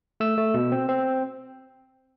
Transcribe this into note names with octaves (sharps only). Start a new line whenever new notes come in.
A3 E6
A3
B2
C4
C4